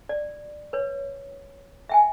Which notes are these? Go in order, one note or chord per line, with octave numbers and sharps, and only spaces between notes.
D5
B4 C#5
E5 G5 G#5